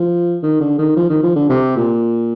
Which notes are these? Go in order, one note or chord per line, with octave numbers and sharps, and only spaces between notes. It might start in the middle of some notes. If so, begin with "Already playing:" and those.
Already playing: F3
D#3
D3
D#3
F3
D#3
F3
D3
C3
A#2